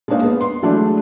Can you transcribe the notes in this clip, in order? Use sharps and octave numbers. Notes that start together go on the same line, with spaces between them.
G#3 A#3 D4 D#4 C5 F5
B3
C6
E3 F#3 G#3 A3 D4 E4